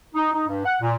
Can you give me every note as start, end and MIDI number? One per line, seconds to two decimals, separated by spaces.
0.15 0.31 63
0.34 0.45 63
0.48 0.66 43
0.66 0.76 78
0.82 0.96 46